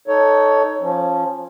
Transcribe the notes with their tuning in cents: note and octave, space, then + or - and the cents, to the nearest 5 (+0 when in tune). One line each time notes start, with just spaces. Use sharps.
D#4 +0 A4 +0 C#5 +15
F3 +5 C#4 -15